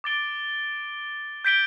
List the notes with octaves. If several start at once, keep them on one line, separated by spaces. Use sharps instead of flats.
D6 A6 D7 G7
G6 B6 D7 G7